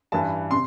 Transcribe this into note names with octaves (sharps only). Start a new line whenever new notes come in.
G2 E3 A5
C3 C6